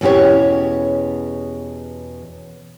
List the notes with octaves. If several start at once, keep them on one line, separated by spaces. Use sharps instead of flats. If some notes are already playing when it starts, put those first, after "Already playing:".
E2 B2 C#4 G4 C#5